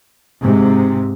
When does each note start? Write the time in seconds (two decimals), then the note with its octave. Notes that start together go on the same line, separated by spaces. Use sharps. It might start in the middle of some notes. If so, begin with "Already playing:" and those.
0.43 G#2 C3